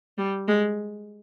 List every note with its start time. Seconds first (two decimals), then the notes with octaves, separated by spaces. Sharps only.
0.18 G3
0.48 G#3